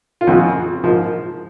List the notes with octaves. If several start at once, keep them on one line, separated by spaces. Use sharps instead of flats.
F4
F2 C#3 G#3 F#4
G#2 F3 A#3